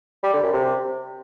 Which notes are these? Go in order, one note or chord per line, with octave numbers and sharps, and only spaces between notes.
G3
D3
F#2
C3